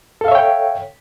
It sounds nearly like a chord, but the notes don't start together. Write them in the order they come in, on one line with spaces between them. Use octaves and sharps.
A4 F5 E5 C#5 G5